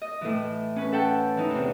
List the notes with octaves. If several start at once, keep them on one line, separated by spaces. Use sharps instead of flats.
D#5
A2 E3
C#4 B4
A4 F#5 G5 A5
E3 D#4
E2 C3